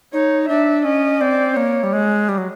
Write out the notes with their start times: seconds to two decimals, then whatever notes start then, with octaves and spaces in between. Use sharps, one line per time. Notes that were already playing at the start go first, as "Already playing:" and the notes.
0.13 D#4 C#5
0.48 D4 E5
0.85 C#4 D#5
1.20 C4 D5
1.56 A#3 C#5
1.83 G3
1.93 G#3
2.29 G3
2.38 F#3